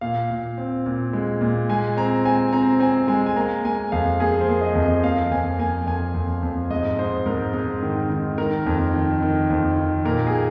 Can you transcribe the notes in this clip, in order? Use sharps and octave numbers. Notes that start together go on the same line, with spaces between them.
A#2 F5
A#2
C4
A#2
G#3
A#2
G#3 G#5
C4 A#5
C4 G#5
C4 A#5
C4 G#5
G#3 G#5
G#5
A#3 A#5
A#3 G#5
F2 F5
A#3 G#4
C5
A#3
D#5
F2
D#5
A#3 F5
F2 G#5
A#3 G#5
F2 G#5
F2
F2
G#2 D#5
G#2 C5
G#2 A#4
G#2
D#3
D#3
D#3 A#4
F2
D#3
D#3
F2
D#3
A#2 A#4
G#4
A#3